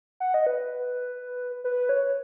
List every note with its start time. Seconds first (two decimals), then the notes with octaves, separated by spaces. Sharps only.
0.20 F#5
0.34 D#5
0.47 B4
1.64 B4
1.89 C#5